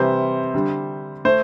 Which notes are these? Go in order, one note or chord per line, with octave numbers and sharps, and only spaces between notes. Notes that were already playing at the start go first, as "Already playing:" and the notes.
Already playing: C3 E3 G3 C5
D3 G3
A3 C5